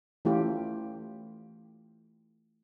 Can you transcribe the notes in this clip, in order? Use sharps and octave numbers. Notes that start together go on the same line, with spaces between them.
E3 A3 C#4 E4 F4 G4